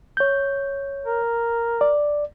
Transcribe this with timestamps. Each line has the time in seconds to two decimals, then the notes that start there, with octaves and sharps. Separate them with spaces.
0.17 C#5 G6
1.06 A#4
1.81 D5